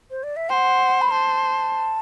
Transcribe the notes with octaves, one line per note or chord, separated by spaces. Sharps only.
C5
D5
E5
C5 F#5 G5
B5
C5 A5